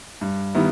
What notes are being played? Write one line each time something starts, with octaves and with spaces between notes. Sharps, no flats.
G2
D#3 G3 B3 E4